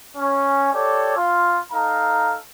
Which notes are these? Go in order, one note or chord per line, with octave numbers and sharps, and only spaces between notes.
C#4
G4 A4 C#5 D5
F4
D#4 A4 F5 A#5